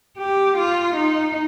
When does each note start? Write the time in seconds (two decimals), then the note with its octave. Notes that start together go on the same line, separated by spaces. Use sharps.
0.18 G4
0.57 F4
0.96 D#4